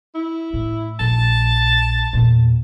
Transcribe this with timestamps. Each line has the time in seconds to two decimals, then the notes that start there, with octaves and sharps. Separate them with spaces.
0.15 E4
0.53 A2
1.00 A#1 A5
2.13 E2 A#2